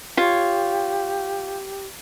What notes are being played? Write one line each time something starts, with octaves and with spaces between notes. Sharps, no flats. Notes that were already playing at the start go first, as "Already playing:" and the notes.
F4 G4 C#5